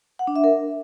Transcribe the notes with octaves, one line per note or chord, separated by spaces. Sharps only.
F#5
D4
E5
A#4